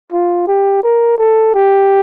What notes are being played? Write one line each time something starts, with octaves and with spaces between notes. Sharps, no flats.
F4
G4
A#4
A4
G4